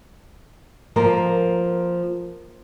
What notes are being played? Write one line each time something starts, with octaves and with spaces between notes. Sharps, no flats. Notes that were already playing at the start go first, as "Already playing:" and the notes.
F3 A#3 A#4